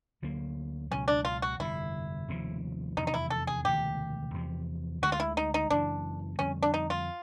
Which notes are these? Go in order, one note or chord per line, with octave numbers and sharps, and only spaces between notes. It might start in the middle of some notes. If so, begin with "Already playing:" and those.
D2 D3 F#3 A#3
C#2 B2 F#3 C#4
D4
F4
F#4
G1 F2 C3 E4
F1 D#2 C#3 F3
F1 E2 C3 D#3 D#4
D#4
E4
A4
G#4
E1 D2 C3 D#3 G4
E2 C3 F3
D2 D3 F3 G#3 F#4
F4
E4
D#4
D#4
F#1 F#2 C#3 E3 D4
F2 D3 G3 C#4
D4
D#4
F4